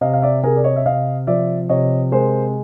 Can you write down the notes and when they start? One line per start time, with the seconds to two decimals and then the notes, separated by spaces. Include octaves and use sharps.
0.01 C3 D#5 F5
0.13 F5
0.22 D5 E5
0.43 C3 G#4 A#4
0.56 D5
0.64 C#5 D#5
0.76 E5
0.86 C3 D#5 F5
1.27 F3 D5 E5
1.69 C3 C#5 D#5
2.12 G#3 A#4 C5